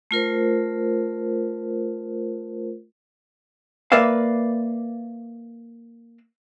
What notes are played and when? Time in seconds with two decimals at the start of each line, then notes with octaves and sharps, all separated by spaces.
0.11 A3 F4 A#4 C5
3.92 A#3 A#4 B4 D5 E5 F5